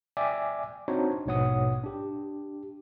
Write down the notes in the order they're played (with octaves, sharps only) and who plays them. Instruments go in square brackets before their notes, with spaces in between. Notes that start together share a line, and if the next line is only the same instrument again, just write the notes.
[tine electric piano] D5 E5 G5 G#5 D6
C4 D4 D#4 F#4 C5 C#5
A#1 G#2 B2 C#5 F#5 D#6
D4 G4